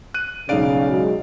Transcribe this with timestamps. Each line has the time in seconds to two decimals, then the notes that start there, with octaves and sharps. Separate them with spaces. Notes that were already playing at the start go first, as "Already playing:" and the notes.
0.14 F#6 D#7
0.49 B1 C#3 D#4 D5 F5 D7
0.89 F#3 G#3